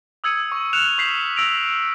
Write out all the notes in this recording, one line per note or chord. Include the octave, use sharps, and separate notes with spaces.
D#6 E6 G#6 C#7 D#7
C#6
F6 F#6 C#7 E7 F7
C#6 G6 B6 C7 F7 F#7
E6 A#6 D7 F7